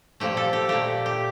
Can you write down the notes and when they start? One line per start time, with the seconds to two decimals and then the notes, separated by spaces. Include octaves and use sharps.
0.20 A#2 F3 A3 G4
0.37 A4
0.53 G4
0.69 A#2 A3 G4
1.06 G4